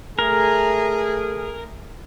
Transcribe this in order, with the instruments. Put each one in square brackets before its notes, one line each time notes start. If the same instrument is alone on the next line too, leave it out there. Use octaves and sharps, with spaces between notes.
[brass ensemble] A3 G#4 [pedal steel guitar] A#4